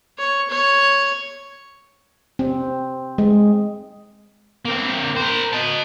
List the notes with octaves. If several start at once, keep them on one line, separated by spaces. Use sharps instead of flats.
C#5
C#5
C4
G#3
A#3 C4
A#4 C5
D#5 A5